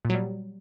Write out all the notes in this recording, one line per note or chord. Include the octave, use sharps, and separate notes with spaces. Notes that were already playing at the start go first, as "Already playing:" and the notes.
A#2
F#3
G3